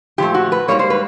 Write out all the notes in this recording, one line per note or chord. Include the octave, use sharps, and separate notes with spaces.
A#2 F3 A3 G4
F#4
B4
G#2 D#3 G3 A#3 C#5
C5
B4